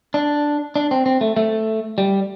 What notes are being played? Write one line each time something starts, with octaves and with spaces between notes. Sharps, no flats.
D4
D4
C4
C4
A3
A3
G3